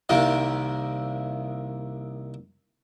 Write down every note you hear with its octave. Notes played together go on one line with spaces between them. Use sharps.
C2 C3 D#3 A#3